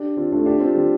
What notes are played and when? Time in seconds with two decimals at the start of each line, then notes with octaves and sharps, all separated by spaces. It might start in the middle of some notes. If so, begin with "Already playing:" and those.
Already playing: D4 G4
0.17 C4 F4
0.32 A3 D4
0.46 D4 G4
0.60 C4 F4
0.74 G3 C4